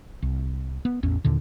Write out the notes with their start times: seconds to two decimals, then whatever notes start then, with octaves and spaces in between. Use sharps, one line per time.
0.22 C2
0.85 B3
1.03 A1 E2 C#4
1.25 D#2 A#2 D3